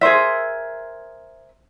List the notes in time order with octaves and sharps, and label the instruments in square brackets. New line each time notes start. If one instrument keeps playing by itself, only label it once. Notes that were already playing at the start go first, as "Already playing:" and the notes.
[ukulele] G#4 A#4 C5 E5